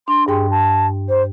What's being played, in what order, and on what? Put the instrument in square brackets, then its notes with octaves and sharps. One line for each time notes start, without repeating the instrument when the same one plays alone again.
[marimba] D4 [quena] C6
[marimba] G2 G5 C6 [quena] G#4
[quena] A5
C5